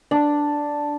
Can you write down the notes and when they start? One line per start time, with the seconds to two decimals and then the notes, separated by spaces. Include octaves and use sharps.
0.11 D4